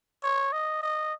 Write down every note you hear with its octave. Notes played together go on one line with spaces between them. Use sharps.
C#5
D#5
D#5